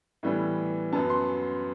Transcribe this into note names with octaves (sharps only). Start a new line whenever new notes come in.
A2 E3 G3 B3
F#2 F#3 B3 A5
C6